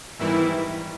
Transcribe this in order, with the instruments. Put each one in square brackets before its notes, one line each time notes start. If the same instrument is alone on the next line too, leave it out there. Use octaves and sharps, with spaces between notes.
[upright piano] G#2 D#3 G3 B3 [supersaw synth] E3 E4